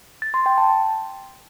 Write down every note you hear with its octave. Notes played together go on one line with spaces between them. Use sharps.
A6
C6
G5
A5